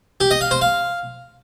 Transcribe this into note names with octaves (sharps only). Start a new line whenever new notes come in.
G4
D#5
F5
C5
F5